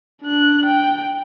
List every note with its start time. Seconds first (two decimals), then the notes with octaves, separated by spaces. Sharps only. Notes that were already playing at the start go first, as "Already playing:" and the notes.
0.23 D4 F#6
0.66 G5